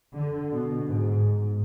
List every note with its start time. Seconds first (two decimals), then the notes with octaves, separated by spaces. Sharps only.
0.13 D3
0.51 B2
0.86 G#2
1.27 G#2